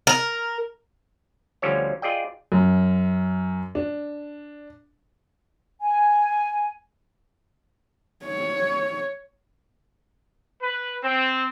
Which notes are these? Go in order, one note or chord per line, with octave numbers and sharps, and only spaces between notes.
A#4
D2 D3 F3 G3 C#4 C#5
F4 G#4 D5 D#5 G5
F#2
D4
G#5
C#5
B4
C4